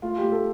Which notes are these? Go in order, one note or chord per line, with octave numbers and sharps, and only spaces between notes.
A3 F4
A3 G4
A4